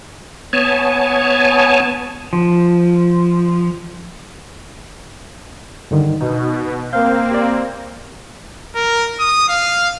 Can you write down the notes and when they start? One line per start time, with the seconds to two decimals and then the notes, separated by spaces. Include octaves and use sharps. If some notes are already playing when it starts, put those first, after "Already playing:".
0.53 B3 C#5 G#5 A5
2.33 F3
5.91 G2 D3 D#3
6.21 B2 D#4
6.93 A#3 C4 F5 G6
7.31 G4 D5
8.75 A#4
9.20 D#6
9.49 F5